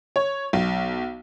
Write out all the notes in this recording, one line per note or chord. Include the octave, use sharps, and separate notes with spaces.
C#5
B1